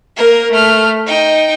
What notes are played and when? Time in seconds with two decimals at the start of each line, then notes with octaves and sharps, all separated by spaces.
0.17 A#3 A#4
0.52 A3 F6
1.07 D#4 G5